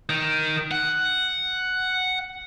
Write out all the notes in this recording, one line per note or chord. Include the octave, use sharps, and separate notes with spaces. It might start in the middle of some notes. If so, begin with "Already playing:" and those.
D#3
F#5